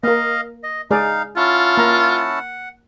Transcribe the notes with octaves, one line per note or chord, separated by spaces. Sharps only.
A#3 A#4 D#5 F5
D#5
G#3 D#4 G#4 D5 F5
C#4 E4 F4 F#5 A5
A#3 A#5